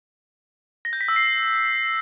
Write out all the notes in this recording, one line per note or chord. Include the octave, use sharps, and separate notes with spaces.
A#6
G6
B6
E6
C7